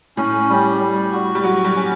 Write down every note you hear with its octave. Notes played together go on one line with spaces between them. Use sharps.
A2 C#4
G3
G3
F#4
G3
F#3 F#4
G3
C#4